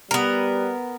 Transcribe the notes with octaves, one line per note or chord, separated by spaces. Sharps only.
G3 B3 A#4